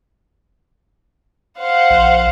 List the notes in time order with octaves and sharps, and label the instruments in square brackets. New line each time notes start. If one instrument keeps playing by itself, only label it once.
[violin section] C5 F#5 [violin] F5
[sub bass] A#1